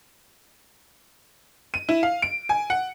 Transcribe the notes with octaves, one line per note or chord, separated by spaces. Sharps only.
D#7
E4
F5
D7
G#5
F#5